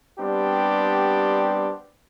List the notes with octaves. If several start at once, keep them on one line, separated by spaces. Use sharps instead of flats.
G3 B3 C4 D4 G4